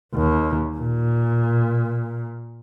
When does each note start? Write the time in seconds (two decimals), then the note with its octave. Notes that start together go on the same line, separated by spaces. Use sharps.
0.14 D#2
0.77 A#2